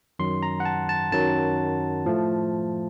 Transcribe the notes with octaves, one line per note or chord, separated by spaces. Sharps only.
F#2 D#3 F#3 C6
A#5
F#5
A5
A5
F#2 D#3 F#3 A5
A2 F3 A3